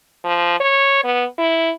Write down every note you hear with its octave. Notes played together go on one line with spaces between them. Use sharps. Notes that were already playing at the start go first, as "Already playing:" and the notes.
F3
C#5
B3
E4